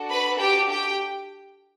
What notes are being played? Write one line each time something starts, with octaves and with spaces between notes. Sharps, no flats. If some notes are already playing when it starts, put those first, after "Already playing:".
Already playing: D4 F#4 A4
B4 B5
G4 G5
G4 G5